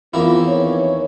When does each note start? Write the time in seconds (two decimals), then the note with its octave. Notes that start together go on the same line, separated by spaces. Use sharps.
0.14 E2 A#3 C4 E4 F4
0.48 D#3 E3 C#5